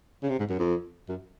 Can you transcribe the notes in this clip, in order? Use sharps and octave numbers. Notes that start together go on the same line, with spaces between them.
C#3
C3
G#2
F#2
F2
F#2